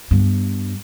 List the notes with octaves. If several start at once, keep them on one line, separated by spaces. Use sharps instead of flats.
G2 B3